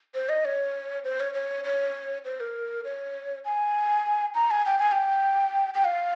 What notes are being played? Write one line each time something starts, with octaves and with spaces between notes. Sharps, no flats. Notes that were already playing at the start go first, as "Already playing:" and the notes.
C5
D#5
C#5
C5
C#5
C#5
C#5
C5
A#4
C#5
G#5
A#5
G#5
G5
G#5
G5
G5
F5